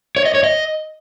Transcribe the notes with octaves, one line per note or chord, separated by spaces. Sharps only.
C#5
D#5
C#5
D#5